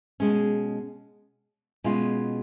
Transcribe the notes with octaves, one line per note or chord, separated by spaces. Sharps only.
B2 G#3 C#4
B2 G#3 C#4 F4